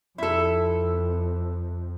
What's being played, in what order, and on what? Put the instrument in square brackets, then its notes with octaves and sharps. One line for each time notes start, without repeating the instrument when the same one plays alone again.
[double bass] F2 [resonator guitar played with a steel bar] E4 A4